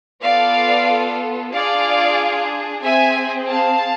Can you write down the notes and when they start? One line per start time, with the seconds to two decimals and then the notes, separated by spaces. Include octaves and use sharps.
0.22 B3 F4 A4 D5 F5
1.52 D4 F4 G#4 D5 F5
2.83 C4 G#4 E5 G#5
3.47 F5 A5